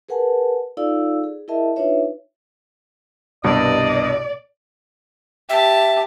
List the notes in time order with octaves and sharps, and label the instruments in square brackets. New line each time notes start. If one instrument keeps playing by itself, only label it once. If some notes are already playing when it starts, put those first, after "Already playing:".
[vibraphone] G#4 A#4 B4 F#5 G#5 A5
D#4 F4 A4 D5 F5 E6
G#4
E4 G#4 A#4 D#5 E5 A5
D4 D#4 F4 B4 C#5 E5
[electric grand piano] C2 G2 B2 [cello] D5 [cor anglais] D#5
[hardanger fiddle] G4 A5 [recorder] E5